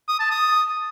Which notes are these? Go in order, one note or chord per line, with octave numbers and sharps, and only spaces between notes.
D#6
A5
D#6